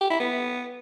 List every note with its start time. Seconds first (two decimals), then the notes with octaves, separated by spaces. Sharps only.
0.01 G4
0.11 E4
0.20 B3